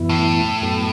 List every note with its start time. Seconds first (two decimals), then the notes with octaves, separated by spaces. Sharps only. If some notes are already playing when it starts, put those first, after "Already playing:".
Already playing: F#2 E3 B3 E4
0.09 A2
0.61 F#2 F#3 B3 A4